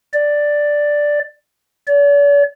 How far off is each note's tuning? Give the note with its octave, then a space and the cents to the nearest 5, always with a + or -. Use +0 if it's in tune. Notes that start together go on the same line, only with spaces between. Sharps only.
D5 +5
D5 -45